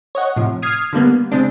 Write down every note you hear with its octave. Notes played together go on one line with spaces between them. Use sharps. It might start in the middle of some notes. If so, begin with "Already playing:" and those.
C#5 D#5 F#5
A2 C3 F3
D#6 F6 G#6 C7
D3 G3 A#3 B3
C#3 G#3 C4 D4